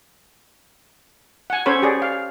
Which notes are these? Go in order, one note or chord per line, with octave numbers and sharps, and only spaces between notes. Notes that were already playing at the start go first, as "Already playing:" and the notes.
F#5 G#5
C#4 A4 C5 C#5 B5
G4 G#4 D5
F5